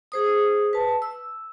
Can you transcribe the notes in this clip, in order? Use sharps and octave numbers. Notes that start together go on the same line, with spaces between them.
G#4 C5 D#6
B4 A5
E6